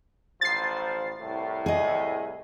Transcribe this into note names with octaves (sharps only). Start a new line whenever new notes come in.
A1 F3 C5 A6 C7
C2 A2
G#4 D#5